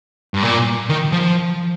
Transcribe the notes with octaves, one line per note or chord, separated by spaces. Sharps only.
G2
A#2
D#3
F3